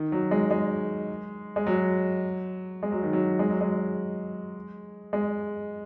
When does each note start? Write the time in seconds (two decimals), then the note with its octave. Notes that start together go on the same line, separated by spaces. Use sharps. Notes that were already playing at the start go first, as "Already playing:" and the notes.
Already playing: D#3
0.12 F#3
0.31 G#3
0.51 G#3
1.56 G#3
1.67 F#3
2.83 G#3
2.92 F#3
3.03 D#3
3.13 F#3
3.39 G#3
3.50 F#3
3.61 G#3
5.13 G#3